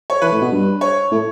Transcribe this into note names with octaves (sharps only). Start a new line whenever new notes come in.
C#5
E3 B4
A2
B2
G2
C#5
A2